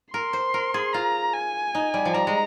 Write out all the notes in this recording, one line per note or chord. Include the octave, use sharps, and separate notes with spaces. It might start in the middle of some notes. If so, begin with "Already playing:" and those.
A#4 C6
C5
A#4
G#4
F4 A#5
G#5
D#4
G3
F3
G3 A#5
G#3